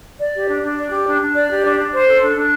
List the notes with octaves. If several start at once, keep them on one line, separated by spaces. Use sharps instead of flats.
D5
G4
D4
D4
D5
G4
D4
D4
D5
G4
D4
D4
C5
A4
D4
D4